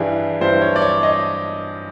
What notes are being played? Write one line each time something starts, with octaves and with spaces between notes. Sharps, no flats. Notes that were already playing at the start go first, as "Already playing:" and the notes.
Already playing: G2 E3 G3 G#4
G2 E3 G3 C5
C#5
D5
C#5
D#5